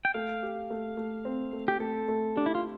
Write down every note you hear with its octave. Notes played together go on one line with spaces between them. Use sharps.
G5
A3 F5
G4
A3
A3
C4
A3
G4
A3 A4
A3
D4 G4
E4
F4